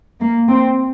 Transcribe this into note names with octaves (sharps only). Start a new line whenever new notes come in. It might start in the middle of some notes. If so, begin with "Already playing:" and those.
A#3
C4